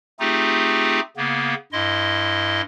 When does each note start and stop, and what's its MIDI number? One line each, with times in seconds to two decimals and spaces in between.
0.20 1.00 57
0.20 1.00 60
0.20 1.00 63
0.20 1.00 65
0.20 1.00 67
0.20 1.00 68
1.17 1.54 49
1.17 1.54 58
1.17 1.54 59
1.72 2.61 43
1.72 2.61 64
1.72 2.61 75
1.72 2.61 84